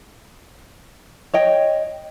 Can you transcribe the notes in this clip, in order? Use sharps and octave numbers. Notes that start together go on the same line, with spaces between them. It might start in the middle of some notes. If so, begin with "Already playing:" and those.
C#5 D#5 G5